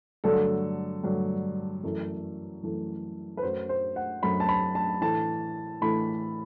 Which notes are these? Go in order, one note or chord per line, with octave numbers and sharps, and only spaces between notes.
G2 D3 F#3 A3 A4
G2 D3 F#3 A3
F#2 E3 A3
F#2 E3 A3
B4
F#2 F#3 A3 C5
C5
F#5
F#2 F#3 A3 B5
A5
B5
A5
A2 E3 A3 A5
A2 E3 A3 B5